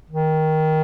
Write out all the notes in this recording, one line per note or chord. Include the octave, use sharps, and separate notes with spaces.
D#3